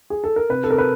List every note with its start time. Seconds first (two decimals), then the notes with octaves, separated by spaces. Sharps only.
0.10 G#4
0.24 A4
0.36 A#4
0.49 C3 B4
0.64 A4
0.69 C3 A#4
0.78 B4